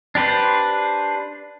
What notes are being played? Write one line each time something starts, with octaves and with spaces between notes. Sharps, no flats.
D4 G4 B4 C5